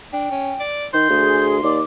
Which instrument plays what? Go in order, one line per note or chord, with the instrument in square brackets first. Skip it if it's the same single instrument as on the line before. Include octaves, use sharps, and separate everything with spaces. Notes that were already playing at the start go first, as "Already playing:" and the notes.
[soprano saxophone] D4 [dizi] G5
[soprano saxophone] C#4
D5
[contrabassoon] D#3 [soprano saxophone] C6 [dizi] G6
[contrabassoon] D2 [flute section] G#4
[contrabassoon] D#2 [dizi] D5 [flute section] D6